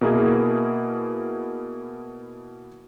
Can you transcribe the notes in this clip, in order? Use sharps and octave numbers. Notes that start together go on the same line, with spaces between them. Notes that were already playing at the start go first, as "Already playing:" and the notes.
B2 A#3 E4 G#4 A#4